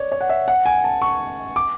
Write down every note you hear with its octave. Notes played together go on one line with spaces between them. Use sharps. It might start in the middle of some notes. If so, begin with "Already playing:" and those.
Already playing: C#5 D5
C#5
F#5
E5
F#5
G#5
A5
C#6
D6